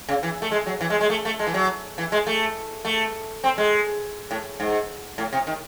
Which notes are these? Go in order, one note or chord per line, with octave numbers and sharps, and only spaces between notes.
C#3
E3
A3
G#3
F#3
E3
G#3
G#3
A3
A3
G#3
E3
F#3
E3
G#3
A3
A3
C4
G#3
A2
G#2
A2
C3
D#3